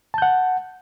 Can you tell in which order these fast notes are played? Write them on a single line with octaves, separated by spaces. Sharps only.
A5 G6 F#5